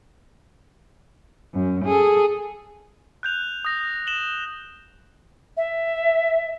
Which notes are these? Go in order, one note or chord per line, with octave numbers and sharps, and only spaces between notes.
F#2
G#4 A4
F#6 G6 F7
D#6 A#6
E7 F#7 G7
E5